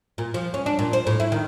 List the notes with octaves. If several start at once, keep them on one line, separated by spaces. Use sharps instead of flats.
A#2
F3
C#4
D4
A#2
C5
A2
E4
D#3